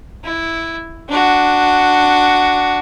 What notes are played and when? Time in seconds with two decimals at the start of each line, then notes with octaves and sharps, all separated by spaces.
0.24 E4
1.09 D4 F#4